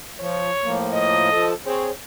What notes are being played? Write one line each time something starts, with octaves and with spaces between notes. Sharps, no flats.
F3 C#5
A2 F3 A#3
D#5
F3 A4 A5
C4 G#4 C5 C#5